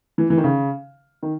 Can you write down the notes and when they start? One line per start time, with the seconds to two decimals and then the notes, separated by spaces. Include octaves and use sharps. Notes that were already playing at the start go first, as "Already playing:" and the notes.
0.18 E3
0.30 E3
0.37 D#3
0.44 C#3
1.23 D#3